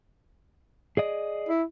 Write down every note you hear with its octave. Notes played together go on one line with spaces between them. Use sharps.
G#4 D5 D#5
E4